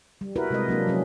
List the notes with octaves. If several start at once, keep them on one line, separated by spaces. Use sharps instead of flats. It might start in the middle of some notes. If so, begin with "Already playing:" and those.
G3
E4 F#4 A#4 B4
C3 G#3 D#5
F#3 A#3 D4
F3 F#3 C#4 G#4